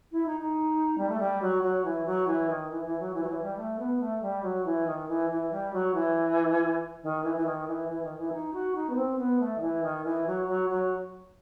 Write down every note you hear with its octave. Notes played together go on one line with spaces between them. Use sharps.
E4
D#4
D#4
G3
A3
G3
F#3
F#3
E3
F#3
E3
D#3
E3
E3
F#3
E3
F#3
E3
G3
A3
B3
A3
G3
F#3
E3
D#3
E3
E3
G3
F#3
E3
D#3
E3
E3
D#3
E3
E3
D#3
E3
D#4
F#4
D#4
B3
C4
B3
A3
D#3
E3
D#3
E3
F#3
F#3
F#3